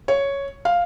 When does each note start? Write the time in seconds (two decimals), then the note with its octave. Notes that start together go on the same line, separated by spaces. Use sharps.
0.08 C#5
0.65 F5